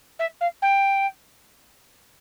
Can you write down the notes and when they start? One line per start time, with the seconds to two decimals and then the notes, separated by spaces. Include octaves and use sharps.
0.19 E5
0.41 F5
0.62 G5